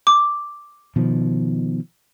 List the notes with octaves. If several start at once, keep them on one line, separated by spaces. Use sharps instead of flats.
D6
B2 D#3 F3